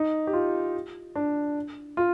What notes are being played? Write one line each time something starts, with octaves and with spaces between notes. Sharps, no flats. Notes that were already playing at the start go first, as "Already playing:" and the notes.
Already playing: D#4
G4
F4
D4
F4